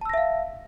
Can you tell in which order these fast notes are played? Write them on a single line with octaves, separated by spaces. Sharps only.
A5 E6 A#6 E5 F5